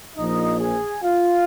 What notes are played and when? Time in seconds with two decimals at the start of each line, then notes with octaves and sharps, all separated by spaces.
0.16 A#1 A#2 F3 D#4 D#5
0.60 G#4 G#5
1.03 F4 F5